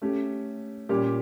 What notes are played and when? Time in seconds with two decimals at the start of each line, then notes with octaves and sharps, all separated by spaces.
0.02 A3 C#4 G4
0.89 A#2 G3 C#4 G4